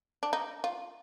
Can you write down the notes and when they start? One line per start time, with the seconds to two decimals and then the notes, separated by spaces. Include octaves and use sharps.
0.23 D4
0.33 D#4
0.64 F4